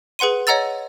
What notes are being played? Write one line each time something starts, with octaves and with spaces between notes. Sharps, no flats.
G#4 B4 F#5 C6 D#7
C#5 D#5 F#5 A#5 E6 A6